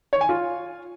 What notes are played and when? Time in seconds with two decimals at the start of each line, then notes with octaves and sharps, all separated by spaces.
0.13 C#5
0.21 G#5
0.29 F4